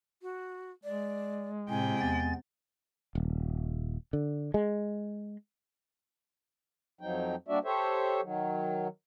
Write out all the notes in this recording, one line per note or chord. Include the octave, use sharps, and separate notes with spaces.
F#4
G#3 D5
A2 C3 G5 G#5
E2 B3 A6
D#1
D3
G#3
F2 F3 F#3 D#4 G5
G3 A#3 D4 F#4 D5 E5
G4 A4 C5 C#5 E5
D#3 F#3